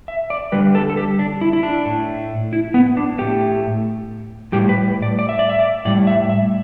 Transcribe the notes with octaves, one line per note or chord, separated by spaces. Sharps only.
E5
D5
D3 G3 B4
A4
A4
G4
D4
E4
E4
D4
A2 A3
E4
B3
D4
A2 A3 G4
A2 G3 G4
B4
D5
D5
E5
D5
E5
D5
A2 G3 D5
E5
E5